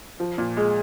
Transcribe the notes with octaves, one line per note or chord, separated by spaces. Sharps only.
F3
A#2
G#3